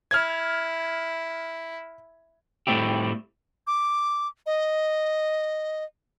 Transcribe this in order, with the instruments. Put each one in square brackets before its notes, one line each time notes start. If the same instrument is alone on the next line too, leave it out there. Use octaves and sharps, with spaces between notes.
[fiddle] E4 [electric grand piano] F6 G#6
[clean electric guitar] A2 G3 A3 C4 E4 G4
[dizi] D6
D#5